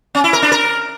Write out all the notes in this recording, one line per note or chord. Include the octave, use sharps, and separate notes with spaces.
C#4
E4
A#4
D4
A#4